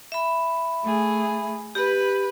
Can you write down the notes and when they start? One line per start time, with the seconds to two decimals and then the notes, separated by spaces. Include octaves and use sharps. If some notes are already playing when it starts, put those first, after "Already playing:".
0.12 E5 B5
0.83 A3 G#4
1.75 G4 B4 B5